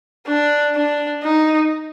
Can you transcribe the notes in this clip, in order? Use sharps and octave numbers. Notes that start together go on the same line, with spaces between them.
D4
D4
D#4